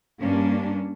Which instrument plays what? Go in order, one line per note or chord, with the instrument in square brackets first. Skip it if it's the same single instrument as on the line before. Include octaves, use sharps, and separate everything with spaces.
[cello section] G2 G3 A#3 C#4 D4